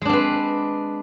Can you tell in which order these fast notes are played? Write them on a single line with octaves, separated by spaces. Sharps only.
G#3 D4 C4 B4